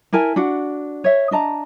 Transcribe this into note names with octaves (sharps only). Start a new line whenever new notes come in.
E4 A#4 G#5 A5
D4 F#4 F#5
C#5 E5
D4 D#5 A5 A#5